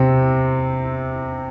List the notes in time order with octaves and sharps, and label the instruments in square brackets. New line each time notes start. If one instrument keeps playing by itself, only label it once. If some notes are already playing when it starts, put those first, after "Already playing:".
Already playing: [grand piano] C3 C4